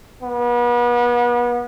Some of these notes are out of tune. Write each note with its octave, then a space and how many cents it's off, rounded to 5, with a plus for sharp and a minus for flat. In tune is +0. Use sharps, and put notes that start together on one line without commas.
B3 -35